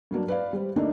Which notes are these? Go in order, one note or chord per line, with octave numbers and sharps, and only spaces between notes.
G2 F#3 A#3 D4
B4 D5 F5
G3 C5
D3 A3 A#3 D4 D#4